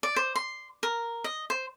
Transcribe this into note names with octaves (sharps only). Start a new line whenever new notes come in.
D5
C5
C6
A#4
D#5
C5